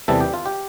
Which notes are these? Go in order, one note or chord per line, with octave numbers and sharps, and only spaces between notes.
E2 C3 E3 G3 A4
G4
F4
G4